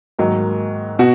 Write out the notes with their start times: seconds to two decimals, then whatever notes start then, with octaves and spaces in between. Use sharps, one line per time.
0.19 G#2 D#3 F#3 A#3
0.99 B2 F#4